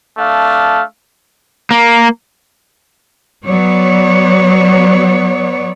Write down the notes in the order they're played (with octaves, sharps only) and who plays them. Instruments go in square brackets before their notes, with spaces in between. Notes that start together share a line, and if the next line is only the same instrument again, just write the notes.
[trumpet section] A3 D4 F5
[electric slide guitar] A#3
[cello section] F#3 B3 C#5 D5